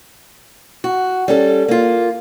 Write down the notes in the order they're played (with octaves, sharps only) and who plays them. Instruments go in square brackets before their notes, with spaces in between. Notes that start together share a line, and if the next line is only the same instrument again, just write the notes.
[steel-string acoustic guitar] F#4
G3 C#4 A4
A#3 F4